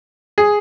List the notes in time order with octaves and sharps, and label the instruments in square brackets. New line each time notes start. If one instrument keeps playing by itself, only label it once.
[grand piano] G#4